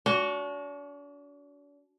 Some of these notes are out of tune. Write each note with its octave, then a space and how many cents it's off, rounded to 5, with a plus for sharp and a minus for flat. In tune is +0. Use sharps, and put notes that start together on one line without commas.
D4 -40 F#4 +0